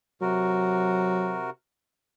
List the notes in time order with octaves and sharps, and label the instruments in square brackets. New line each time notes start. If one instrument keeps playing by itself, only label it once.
[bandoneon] C3 F#4 A#4 [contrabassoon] F#3